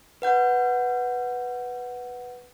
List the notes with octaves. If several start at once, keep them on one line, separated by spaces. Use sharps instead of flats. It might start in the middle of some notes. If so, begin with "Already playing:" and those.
B4 F#5 G6